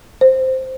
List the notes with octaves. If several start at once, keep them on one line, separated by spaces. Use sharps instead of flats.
C5